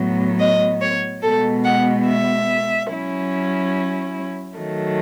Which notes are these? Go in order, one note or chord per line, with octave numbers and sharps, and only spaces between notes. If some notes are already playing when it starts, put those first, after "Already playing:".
Already playing: A2 F#3 B3
D#5
C#5
B2 G#3 B3 A4
F#5
E5
F#3 C#4 E4
D#3 F#3 A3